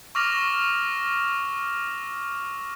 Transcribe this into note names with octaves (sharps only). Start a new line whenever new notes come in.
C#6 D6 E6 F6 A#6 F7